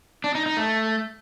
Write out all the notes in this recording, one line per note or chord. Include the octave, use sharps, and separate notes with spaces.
D4
D#4
D#4
A3